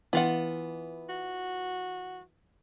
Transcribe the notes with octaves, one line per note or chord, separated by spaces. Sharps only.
E3 B3 F4 F#5
F#4